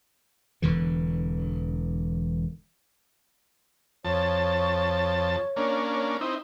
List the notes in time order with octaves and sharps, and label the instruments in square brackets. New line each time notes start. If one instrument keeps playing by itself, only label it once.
[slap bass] E1 D3 E3
[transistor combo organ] F2 A5 [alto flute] C#5
[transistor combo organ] A#3 C#4 D4
C4 D#4 E4